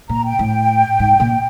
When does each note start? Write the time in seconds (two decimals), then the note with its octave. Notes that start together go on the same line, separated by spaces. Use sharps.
0.09 A#2 A#5
0.25 G5
0.39 A2
0.99 G#2
1.20 A#2